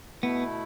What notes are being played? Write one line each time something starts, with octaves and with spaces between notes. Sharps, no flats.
B2 A3 B3 E4